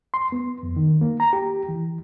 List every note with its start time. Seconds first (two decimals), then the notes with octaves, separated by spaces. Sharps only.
0.14 C6
0.32 B3
0.63 F2
0.76 D#3
1.01 A#3
1.20 A#5
1.33 G4
1.69 E3